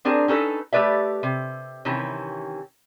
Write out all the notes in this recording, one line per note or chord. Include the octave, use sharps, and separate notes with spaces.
C4 D4 G#4 A#4
C#4 D#4 A4 B4
A3 G4 B4 D5 E5
C3
C3 D#3 E3 C#4